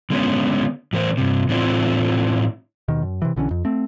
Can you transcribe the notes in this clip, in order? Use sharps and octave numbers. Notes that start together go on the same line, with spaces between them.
D3 G#3 B3 C#4
A2 E3 A#4 C5
G2 C3
A2 E3 C4 D4 E4 F4
D#2 B2 D#3
F#2
C3 E3
B1 D3 E3 C#4
F2
A3 C4